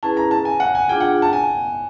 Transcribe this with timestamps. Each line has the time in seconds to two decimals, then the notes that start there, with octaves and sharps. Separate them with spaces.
0.03 C#4 E4 G#4 B4 A5
0.17 A#5
0.31 A5
0.45 G#5
0.60 F#5
0.75 G#5
0.89 D4 F4 G#4 G5
1.00 F#5
1.22 A5
1.33 G#5